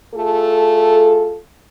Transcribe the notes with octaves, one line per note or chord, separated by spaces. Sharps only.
A3 F4 G#4 A4